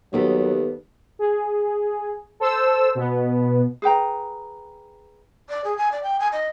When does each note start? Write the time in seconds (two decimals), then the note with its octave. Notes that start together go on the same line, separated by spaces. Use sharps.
0.13 D#2 F#3 G3 B3 A4
1.19 G#4
2.40 A4 C5 E6
2.95 B2 B3
3.82 G#4 B4 G5 A#5
5.49 D5
5.64 G#4
5.77 G#5
5.92 D5
6.03 G5
6.20 G#5
6.32 D#5